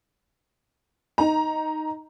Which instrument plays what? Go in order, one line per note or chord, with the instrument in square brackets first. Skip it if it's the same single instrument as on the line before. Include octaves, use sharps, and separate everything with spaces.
[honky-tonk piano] D#4 A#5